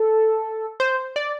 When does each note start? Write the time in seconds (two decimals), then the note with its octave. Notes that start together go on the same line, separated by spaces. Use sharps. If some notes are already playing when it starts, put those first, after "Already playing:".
Already playing: A4
0.80 C5
1.16 D5